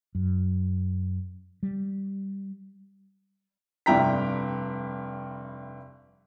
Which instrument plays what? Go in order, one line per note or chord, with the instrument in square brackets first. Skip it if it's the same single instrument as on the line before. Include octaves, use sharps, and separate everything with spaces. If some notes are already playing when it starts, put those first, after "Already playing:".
[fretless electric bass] F#2
G3
[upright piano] F1 G2 E4 G5 A#5 B6